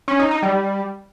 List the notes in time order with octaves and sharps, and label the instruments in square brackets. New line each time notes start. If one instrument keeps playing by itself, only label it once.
[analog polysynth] C#4
D#4
D#4
G3